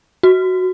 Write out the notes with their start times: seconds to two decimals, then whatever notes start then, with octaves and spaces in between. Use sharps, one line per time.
0.23 F#4